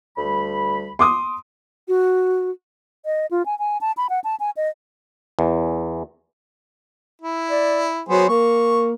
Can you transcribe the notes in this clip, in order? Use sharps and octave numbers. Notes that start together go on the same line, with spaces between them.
D2 G3 B5
C6 D6 D#6
F#4
D#5
F4
G#5
G#5
A5
B5
F#5
A5
G#5
D#5
E2
E4
D5
F#3 B3 G#4 C5
A#3 C#6